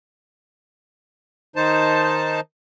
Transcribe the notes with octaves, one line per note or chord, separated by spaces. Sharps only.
D#3 D#4 C5 A5